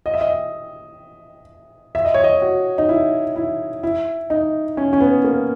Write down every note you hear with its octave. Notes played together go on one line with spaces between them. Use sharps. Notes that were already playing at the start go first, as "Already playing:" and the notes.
D#5
E5
D#5
E5
D#5
C#5
D#5
F#4
D#4
E4
E4
E4
D#4
C#4
C#4
B3
A#3